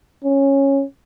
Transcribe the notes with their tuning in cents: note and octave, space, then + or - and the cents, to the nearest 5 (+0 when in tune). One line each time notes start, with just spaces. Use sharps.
C#4 -10